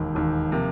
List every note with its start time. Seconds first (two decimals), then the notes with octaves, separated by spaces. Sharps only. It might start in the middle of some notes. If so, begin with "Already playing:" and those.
Already playing: E1 D#2 D#3
0.14 E1 D#2 D#3
0.51 C3 F3 A#3